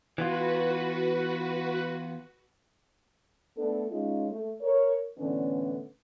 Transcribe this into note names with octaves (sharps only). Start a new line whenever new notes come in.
E3 B3 F4 F#4 B4
A3 B3 D4 A4
G#3 C#4 D#4 F4
A3
A#4 C#5
A2 D3 E3 B3 C#4 D4